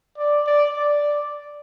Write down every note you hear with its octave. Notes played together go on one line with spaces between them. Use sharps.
D5
D5
D5